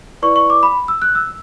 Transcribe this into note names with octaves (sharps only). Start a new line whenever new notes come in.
E4 B4 D5 C#6
C#6
D6
B5
E6
F#6
E6